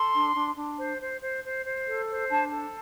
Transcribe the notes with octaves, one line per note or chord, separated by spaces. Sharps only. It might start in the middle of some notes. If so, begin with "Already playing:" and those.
Already playing: A4 C6
D4
D4
D4
C5
C5
C5
C5
C5
A4
C5
D4 A5
A4